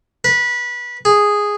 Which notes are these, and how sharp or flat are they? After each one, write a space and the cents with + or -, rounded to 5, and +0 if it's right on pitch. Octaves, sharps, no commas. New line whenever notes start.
B4 -20
G#4 -5